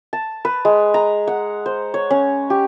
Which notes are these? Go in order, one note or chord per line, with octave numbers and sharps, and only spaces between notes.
A5
B4
G#3
A#5
F#5
C5
C#5
C#4
G4